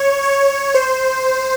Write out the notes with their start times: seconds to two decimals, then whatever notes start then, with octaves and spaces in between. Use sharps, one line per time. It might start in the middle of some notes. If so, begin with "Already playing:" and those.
Already playing: C#5
0.22 C#5
0.74 C5